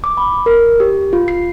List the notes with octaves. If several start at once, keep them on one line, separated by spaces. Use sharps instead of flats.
D6
B5
A#4
G4
F4
C7